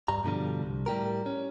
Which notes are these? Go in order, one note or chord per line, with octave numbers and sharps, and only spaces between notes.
G2 G3 A#5
G2 B2 D3 F3 G3
C2
A2 G3 G4 A#4
C#4